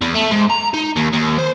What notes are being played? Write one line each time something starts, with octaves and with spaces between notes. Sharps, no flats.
E2
A3
G#2
A#5
D#4
D#2
D#2
C5